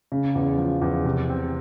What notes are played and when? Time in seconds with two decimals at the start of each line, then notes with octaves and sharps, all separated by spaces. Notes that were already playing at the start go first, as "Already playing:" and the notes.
0.12 C#3
0.35 E2
0.58 F3
0.82 E2
1.05 C3
1.29 C4